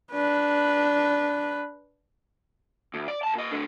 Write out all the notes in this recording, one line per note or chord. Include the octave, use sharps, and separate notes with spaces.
D4 B4
D2
D5
C#2 A5
A#2 D#5
A2 D3